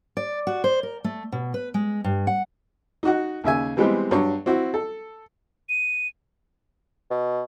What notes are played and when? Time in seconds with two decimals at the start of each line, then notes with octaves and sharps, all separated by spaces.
0.17 D5
0.47 F#4
0.64 C5
0.83 A#4
1.04 A3
1.32 B2
1.54 B4
1.74 G#3
2.04 G2
2.27 F#5
3.03 D#4 F#4 F#5
3.44 D#2 C#3 E5 G#5
3.77 E3 G3 G#3 B3 C4 G4
4.11 G2 F#3 C#6
4.46 C4 E4 F#4
4.74 A4
5.69 D#7
7.10 B2